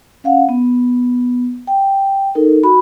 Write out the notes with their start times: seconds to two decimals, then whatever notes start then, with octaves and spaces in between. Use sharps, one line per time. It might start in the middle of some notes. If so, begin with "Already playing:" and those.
0.24 C#4 F5 F#5
0.49 B3
1.67 G5
2.35 D#4 A4 A#4
2.63 F#4 B5